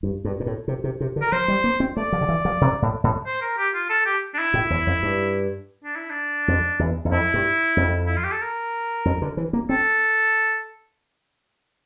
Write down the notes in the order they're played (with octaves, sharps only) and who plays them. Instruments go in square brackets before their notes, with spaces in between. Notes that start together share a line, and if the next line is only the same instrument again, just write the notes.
[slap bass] G2
G2
A#2
A2
C3
C3
C3
D3
[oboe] A#4
[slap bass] F3 [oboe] C5
[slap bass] G3
A#3
C4
[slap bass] A3 [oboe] D5
[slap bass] F3
D3
E3
F3
C3
A2
A2
[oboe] C5
A#4
G4
F4
A4
G4
D4
E4
[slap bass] A2
E2
F2
G2
[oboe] D4
E4
D4
[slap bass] F2
E2
E2
[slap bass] F2 [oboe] E4
[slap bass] G2
F2
[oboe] E4
F4
G4
A4
A#4
[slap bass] F2
D3
E3
A#3
[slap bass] C4 [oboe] A4